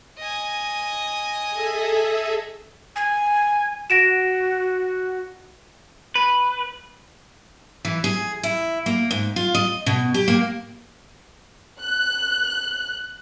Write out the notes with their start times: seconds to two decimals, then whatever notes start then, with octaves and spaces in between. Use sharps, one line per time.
0.19 D#5 G#5
1.49 G#4 A4 E5
2.96 G#5
3.90 F#4 A#6 D7 E7
6.16 B4
7.85 E3
8.04 G#4
8.43 E4
8.86 A#3
9.11 G#2
9.36 F4
9.54 D#5
9.86 B2
10.14 G4
10.28 A#3
11.82 F#6